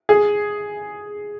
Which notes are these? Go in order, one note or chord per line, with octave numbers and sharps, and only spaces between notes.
G#4